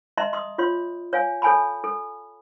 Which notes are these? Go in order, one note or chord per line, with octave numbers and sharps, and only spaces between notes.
D#5 E5 A5 A#5 C6
C6 D#6
F4 C#5 C6
C#5 F5 G#5
A4 C#5 G#5 A5 B5
A4